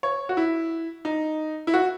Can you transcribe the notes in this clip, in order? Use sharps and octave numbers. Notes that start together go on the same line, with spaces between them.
C#5
F#4
E4
D#4
E4
F#4